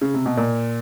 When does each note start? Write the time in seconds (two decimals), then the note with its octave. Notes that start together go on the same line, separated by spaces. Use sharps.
0.01 C#3
0.14 C3
0.26 B2
0.37 A#2